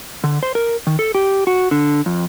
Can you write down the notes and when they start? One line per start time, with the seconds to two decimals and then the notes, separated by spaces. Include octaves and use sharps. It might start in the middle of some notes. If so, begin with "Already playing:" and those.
0.24 D3
0.43 C5
0.55 A#4
0.87 D#3
0.99 A4
1.15 G4
1.47 F#4
1.71 D3
2.06 F2